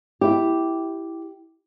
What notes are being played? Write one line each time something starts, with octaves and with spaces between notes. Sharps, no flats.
E4 G4